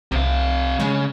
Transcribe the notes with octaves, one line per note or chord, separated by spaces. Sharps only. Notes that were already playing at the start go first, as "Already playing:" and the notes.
C2 C3 F5
C#3 G#3